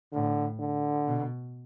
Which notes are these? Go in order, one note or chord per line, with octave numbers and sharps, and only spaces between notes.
A2 D3
D3
B2